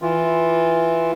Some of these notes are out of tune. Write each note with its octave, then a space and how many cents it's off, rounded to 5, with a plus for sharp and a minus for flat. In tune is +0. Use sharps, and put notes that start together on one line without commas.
E3 +0 F4 +0